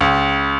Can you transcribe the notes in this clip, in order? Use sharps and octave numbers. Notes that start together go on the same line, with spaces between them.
C#2